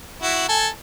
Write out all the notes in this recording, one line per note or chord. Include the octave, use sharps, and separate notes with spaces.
E4 F#4
A4 G#5